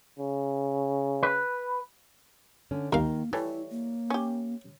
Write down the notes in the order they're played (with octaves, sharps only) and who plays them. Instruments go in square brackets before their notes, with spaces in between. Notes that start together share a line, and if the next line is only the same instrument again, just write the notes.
[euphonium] C#3
[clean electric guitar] B4
[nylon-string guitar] D3 C#4
[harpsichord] D#2 F5 [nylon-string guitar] D#3 D#4 [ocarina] A#3 [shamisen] A#4
[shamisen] E3 G3 A3 [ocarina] E4 [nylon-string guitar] C#5
[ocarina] A#3
[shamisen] C#4 G4